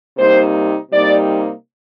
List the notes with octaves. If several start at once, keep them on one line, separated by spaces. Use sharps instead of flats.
C3 G3 A#3 D#4 C5
C3 G3 A#3 D#4 D5